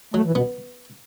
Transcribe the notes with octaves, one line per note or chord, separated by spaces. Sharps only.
F#3 A3
E3
B2 B3